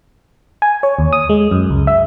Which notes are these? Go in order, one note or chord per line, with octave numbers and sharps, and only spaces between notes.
G#5
C#5
D#2
D#6
G#3
F#2
C#2
E5